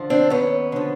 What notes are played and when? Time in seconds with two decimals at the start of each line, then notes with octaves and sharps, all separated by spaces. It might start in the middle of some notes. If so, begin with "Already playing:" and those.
Already playing: D3 F3
0.10 C4 D4
0.30 D#2 B3 C#4
0.72 D3 F3